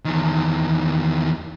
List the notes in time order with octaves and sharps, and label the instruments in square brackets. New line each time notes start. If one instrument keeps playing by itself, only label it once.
[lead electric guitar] E2 D#3